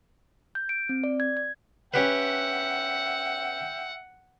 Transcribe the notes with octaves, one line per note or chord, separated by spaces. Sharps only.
G6
D7
C4
D5
G#6
G#6
C#4 G4 B4 E5 F#5 G5